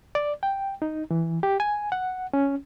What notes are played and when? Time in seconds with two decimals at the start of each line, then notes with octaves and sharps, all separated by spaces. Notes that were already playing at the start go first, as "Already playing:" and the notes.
0.15 D5
0.43 G5
0.82 D#4
1.11 E3
1.43 G4
1.60 G#5
1.92 F#5
2.34 C#4